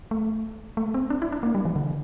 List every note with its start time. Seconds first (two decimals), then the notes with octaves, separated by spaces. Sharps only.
0.11 A3
0.77 A3
0.94 C4
1.10 D4
1.22 E4
1.32 D4
1.43 A#3
1.55 G3
1.65 E3
1.76 D3